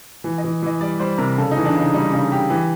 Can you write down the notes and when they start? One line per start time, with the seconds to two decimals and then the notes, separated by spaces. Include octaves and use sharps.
0.24 E3
0.38 D#5
0.44 E3
0.62 E3 D#5
0.81 G3 D5
0.99 G3 C5
1.18 C3 A#4
1.38 C#3 A4
1.51 D#4
1.57 E3
1.65 D4
1.75 C#3 D#4
1.93 G3 D#4
2.12 C#3 D#4
2.32 C#3 G4
2.50 E3 G4